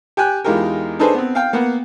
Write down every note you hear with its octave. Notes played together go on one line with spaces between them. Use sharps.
G4 G5 G#5 F#6
E2 G#3 D#4 F4 G4 A#4
D4 D#4 G#4 A4 B4 C5
B3 C4
F5 G5
A#3 B3 F#5